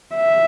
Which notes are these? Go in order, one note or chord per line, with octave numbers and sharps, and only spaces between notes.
E5